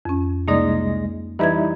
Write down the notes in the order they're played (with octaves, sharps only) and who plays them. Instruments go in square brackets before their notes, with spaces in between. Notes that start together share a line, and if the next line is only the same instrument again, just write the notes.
[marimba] F2 C#4
[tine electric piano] C2 G#3 A#6 [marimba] A#3 D#4 D5
[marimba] E3 B4 G#6 [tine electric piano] G3 D#4 E4